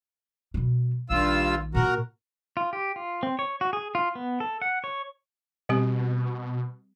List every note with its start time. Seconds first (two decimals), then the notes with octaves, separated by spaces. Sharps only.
0.54 B2 G3
1.10 A#1 G2 D#3 F4 E6
1.75 A#2 A#3 F#4 A#4
2.57 F4
2.73 G4
2.96 F4
3.23 C4
3.39 C#5
3.61 F#4
3.73 G#4
3.95 F4
4.15 B3
4.40 A4
4.62 F#5
4.84 C#5
5.69 B2 G3 C4 G4